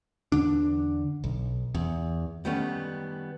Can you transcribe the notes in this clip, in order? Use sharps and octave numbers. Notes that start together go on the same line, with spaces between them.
E2 D3 D4
B1
E2
D#3 G3 A3 B3 C#4